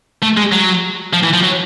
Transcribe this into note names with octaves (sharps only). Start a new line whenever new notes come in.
A3
G#3
F#3
F3
E3
F3
F#3